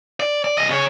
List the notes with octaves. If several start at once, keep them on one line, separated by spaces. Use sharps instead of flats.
D5
D5
C2 D#5
C#3 C#5